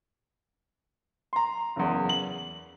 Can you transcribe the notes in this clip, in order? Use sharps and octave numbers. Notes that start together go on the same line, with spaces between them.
A#5 C6
F#1 E2
F#7